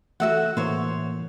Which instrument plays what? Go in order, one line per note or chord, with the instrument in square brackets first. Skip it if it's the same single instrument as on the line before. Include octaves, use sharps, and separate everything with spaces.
[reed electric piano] E3 A3 [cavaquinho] F#4 E5 F#5
[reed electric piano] A2 E3 A#3 [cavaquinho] C5 C#5